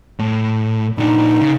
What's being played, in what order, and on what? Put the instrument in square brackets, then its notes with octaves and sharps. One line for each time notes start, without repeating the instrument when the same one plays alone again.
[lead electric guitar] A2
[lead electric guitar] A#2 D4 [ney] D#4
[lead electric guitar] C#3